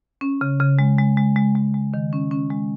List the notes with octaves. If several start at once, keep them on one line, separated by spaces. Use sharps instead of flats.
C#4
C#3
C#3
G#3
G#3
G#3
G#3
G#3
G#3
D#3
C#4
C#4
G#3